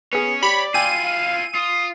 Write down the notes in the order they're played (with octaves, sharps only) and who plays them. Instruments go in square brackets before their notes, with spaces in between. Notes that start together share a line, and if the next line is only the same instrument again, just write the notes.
[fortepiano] B3 G#4 [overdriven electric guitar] C#4
[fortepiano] G4 [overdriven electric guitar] C#5 [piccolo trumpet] D5 [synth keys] B5
[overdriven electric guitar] E4 F4 [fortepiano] G5 G#5 E6 [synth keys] D#7
[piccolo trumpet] F5
[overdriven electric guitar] F4 [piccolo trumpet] D#6